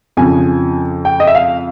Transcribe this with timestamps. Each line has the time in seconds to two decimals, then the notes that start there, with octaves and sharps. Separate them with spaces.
0.17 F2 C#3 F3 G#5
1.05 G5
1.20 D#5
1.27 E5
1.35 F5